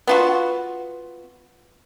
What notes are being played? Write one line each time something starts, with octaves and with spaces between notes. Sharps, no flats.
B3 F4 F#4